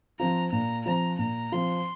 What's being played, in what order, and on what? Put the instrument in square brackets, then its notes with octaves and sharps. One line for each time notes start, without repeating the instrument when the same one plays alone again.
[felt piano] F3 C4 F4 [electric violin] A#5
[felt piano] A#2 [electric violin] A#5
[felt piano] F3 C4 F4 [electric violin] A#5
[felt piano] A#2 [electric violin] A#5
[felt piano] F3 C4 F4 [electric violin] C6